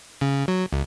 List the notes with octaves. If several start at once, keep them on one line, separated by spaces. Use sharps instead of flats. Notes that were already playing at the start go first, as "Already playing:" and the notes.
C#3
F#3
C#2